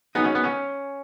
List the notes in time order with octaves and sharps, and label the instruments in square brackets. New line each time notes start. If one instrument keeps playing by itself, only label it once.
[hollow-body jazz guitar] F#3 D#4 G#4 [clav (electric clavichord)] B3
[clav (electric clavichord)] C#4
B3
C#4